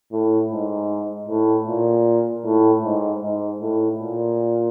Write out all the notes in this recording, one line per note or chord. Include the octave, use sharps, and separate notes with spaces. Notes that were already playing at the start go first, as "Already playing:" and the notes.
A2
G#2
A2
A#2
A2
G#2
G#2
A2
A#2